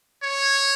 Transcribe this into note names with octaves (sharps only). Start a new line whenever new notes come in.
C#5